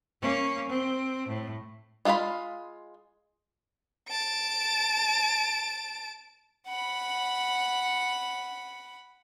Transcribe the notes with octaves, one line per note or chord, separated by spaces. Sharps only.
A#3 C#4
C4
A2
G#3 F4 A4 F5 B5
A5 D7
F#5 B5